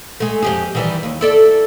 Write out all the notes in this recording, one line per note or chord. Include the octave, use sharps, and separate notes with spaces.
G#3 A3
F2 G4 G#4
D#3 E3 G3
D#2
E4 A4 D5